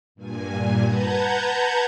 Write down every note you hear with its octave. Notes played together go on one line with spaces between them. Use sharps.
G2 A#2 G#5
B4 F#5 A5 A#5 G6 G#6